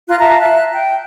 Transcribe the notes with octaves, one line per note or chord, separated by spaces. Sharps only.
F4 A#5 F#6
E5 F5 A5 A#5
E5 F#6
G5